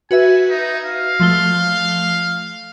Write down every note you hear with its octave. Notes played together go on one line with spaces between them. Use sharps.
F#4 B4 E5 G#5
D#4
F5
F3 A3 G7